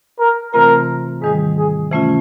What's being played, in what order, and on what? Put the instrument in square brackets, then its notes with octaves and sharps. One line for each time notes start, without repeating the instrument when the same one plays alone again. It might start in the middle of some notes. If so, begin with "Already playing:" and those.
[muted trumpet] A#4
[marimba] C3 E3 A3 C4 F4 [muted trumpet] A#4
[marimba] G#2 D#3 G3 [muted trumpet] G#4
[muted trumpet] G#4
[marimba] C3 E3 A3 C#4 F4